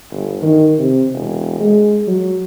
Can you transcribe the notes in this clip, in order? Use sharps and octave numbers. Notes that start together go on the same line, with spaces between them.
G1
D#3
C3
E1
G#3
F#3